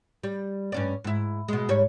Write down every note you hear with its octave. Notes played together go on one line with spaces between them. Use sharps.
G3
G2 C#4 D5
G#2 E4
B2 G#3
G#2 G3 C#5